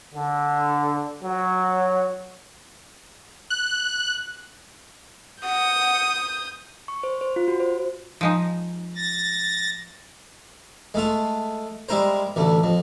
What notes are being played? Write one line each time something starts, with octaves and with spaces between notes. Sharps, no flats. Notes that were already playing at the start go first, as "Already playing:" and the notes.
D3
F#3
F#6
F#5 D#6 G6
C#6
C5
C5
F4
F#4
C5
F3 G#3 D#4
A6 A#6
G#3 A3 F4
G3 G#3 E4 A#4 C5
A1 D2 A3
F2